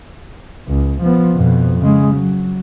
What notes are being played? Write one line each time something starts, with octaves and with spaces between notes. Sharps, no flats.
C#2
F3 B3
F2 B2
C#3 G#3
F#3